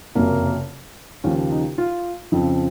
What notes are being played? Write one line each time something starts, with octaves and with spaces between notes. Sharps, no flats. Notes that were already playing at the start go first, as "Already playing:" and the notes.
F#1 F2 C3 F#3 A#3
D#2 C#3 F3 C#4
D#4
F4
F2 C#3 F3